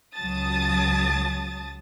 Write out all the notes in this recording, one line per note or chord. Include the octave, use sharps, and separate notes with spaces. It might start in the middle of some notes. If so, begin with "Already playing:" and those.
C#2 F#3 A5 D#6 A6